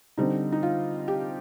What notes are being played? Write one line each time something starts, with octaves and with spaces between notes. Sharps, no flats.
D3 G3 C4 D#4
D#4
F4
G4